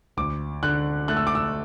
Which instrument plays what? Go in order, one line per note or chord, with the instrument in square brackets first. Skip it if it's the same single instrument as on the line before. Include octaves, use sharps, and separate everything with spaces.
[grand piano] D2 D6
D3 F#6
A3 F#6
E6
D6
E6